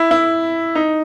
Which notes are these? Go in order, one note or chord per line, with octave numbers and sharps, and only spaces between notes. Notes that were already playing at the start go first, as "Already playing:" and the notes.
Already playing: E4
E4
D#4